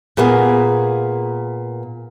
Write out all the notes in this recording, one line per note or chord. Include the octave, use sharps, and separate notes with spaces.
A#2 A#3 B3 G#4